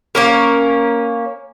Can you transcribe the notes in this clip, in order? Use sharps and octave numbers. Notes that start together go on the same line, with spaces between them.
A#3 C#4 A#4